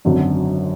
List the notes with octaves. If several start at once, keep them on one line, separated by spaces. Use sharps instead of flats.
G#1 F#2 D3 F#3